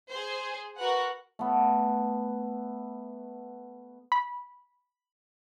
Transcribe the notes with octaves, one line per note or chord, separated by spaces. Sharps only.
G#4 C5
F#4 A#4 B4 F#5
A3 B3
B5